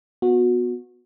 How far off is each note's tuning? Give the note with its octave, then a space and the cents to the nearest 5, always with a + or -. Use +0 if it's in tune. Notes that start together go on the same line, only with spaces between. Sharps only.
B3 +0 F#4 -25